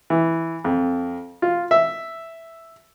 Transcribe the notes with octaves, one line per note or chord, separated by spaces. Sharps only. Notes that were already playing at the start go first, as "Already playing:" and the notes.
E3
F2
F4
E5